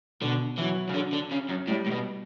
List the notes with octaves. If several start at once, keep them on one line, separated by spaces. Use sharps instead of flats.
B2 D3
E3 F#3
C#3
D3
D3
C#3
F#2
A2 G3
A2
B2